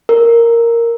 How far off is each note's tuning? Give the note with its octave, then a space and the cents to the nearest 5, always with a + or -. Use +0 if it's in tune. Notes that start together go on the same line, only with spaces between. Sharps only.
A#4 -5